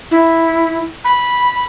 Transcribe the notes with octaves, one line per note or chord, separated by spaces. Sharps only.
E4
B5